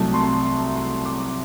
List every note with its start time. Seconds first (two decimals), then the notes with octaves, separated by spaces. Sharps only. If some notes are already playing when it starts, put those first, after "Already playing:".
Already playing: C2 C3 F#3 A3 A5
0.14 C6
0.76 C6
1.06 D6